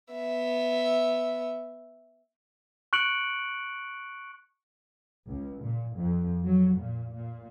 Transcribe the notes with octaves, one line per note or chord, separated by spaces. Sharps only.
B3 E5
C#6 F#6 C#7 D7 F#7
C#2
A#2
F2
F#3
A#2
A#2